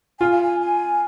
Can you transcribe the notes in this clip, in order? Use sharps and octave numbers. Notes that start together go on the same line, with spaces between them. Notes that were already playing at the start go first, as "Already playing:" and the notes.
F4 G#5
F5
G#5
G#5